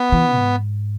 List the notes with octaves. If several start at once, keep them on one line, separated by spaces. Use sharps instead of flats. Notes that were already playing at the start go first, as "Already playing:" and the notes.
Already playing: B3
E3
G#2